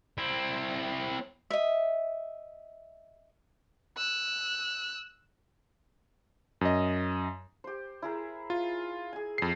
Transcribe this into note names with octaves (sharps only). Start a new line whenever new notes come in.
C4 E4
D#5 E5
E6 F#6
F#2 D#5
G4 C5
E4 G#4 A#4
F4
G#4 G#5
F2 C7